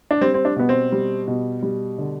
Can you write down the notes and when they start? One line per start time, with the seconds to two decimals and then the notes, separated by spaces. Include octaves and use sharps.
0.11 D4
0.21 G3 C4
0.34 C4
0.45 D4
0.56 B2 B3
0.69 C4
0.92 G3
1.28 B2
1.63 G3
1.98 D3